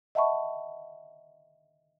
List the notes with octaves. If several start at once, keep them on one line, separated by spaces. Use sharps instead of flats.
D#5 E5 F#5 A5 B5 C#6